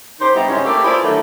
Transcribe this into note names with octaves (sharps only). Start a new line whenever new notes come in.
C#3 D#4 G4 C5
D3 G3 A3 B3 D#4 E4
F#2 C3 G#3 C#4
A3 A#3 E4 G4
E4 F4 G#4 B4 C5 D5
D3 D#3 F#3 A3